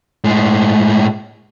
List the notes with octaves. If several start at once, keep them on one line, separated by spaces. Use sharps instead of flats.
A2 G#3